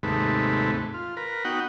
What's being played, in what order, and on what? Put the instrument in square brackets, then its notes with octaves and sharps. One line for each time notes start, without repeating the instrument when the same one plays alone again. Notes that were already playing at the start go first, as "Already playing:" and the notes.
[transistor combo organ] D#2 G#2 C3 A3 B4
F4
A#4 B4
B3 D#4 F#4 F#5 G5